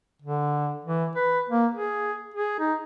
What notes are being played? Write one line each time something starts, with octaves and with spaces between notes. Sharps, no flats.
D3
E3
B4
A#3
G#4
G#4
D#4